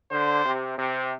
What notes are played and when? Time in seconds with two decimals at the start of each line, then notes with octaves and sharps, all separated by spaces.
0.11 D3 C5
0.45 C3
0.79 C3